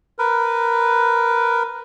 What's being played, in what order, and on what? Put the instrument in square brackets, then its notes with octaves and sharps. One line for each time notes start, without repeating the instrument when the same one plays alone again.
[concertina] A#4 B4